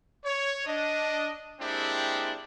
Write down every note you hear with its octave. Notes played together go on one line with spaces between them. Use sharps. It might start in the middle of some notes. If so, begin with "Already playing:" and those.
C#5
D4 D#5
G#3 A#3 C4 D4 E4 G4